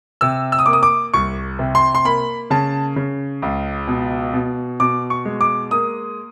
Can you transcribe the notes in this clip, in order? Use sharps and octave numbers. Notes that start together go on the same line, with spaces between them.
C3 E6
E6
D#6
A#3 D6
D#6
D6
C2 C#6
C3
C6
C6
A#3 B5
C#3 A5
C#3
C#2
B2
B2
B2 D6
C#6
G#3
D6
A#3 D#6